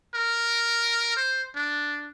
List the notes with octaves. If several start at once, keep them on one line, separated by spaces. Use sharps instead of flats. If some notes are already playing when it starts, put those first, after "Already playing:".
A#4
C5
D4